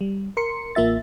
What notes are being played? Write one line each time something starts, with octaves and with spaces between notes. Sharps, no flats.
G3
A#4 C6 C#7
A1 A#3 F4 E5 A6